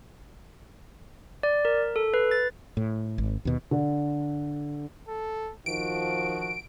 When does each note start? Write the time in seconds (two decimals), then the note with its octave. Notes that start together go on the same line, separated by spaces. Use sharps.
1.43 D5
1.65 A#4
1.96 A4
2.14 B4
2.31 A6
2.77 A2
3.18 G#1
3.45 D#2 B2
3.71 D3
5.08 A4
5.66 D#3 F3 F#4 D7